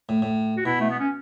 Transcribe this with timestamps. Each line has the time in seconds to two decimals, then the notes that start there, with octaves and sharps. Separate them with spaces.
0.09 A2
0.22 A2
0.57 F#4
0.65 B2 E4
0.81 A3
0.90 B3
1.00 C#4